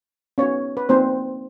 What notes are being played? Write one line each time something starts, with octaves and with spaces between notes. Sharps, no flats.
B3 C#4 D#4 F#4 C#5
B4
A#3 C4 D#4 F#4 C5